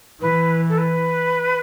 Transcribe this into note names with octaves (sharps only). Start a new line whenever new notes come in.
E3 B4
A4
B4